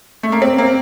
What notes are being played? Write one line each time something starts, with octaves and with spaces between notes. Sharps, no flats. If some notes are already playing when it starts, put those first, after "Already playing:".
A3
A#3
C4
A#3